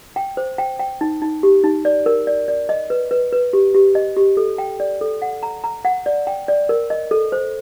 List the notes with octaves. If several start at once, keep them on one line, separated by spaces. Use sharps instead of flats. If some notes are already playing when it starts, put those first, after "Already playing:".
G5
C5
G5
G5
D#4
D#4
G4
D#4
D5
A#4
D5
D5
D#5
B4
B4
B4
G4
G4
D#5
G4
A4
G5
D5
A4
F#5
A#5
A#5
F#5
D5
G5
D5
A#4
D#5
A4
C5